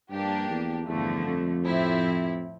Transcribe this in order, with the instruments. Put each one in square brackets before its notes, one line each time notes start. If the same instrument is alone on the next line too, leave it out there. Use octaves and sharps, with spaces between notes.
[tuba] G2 [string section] F3 A#3 D4 G4
[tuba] E2
[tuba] E2 [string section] G2 D3 F3 A3
[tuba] F2
[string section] A2 F3 C4 E4